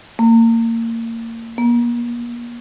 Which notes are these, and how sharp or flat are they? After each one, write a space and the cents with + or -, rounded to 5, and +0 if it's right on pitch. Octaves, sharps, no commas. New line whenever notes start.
A#3 -30
A#3 +40